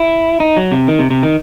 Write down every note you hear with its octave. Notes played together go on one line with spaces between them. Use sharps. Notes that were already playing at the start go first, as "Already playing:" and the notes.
Already playing: E4
D#4
F#3
C3
D#3
C3
C3
D#3